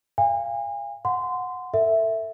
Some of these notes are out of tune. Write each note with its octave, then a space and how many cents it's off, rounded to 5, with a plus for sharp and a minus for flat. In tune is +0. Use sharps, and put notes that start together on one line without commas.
F5 -20 G#5 -40
F#5 -15 C6 -20
A4 +35 E5 +0